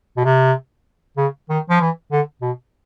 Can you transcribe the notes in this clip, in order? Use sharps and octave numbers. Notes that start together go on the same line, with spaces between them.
B2
C3
C#3
D#3
F3
E3
D3
B2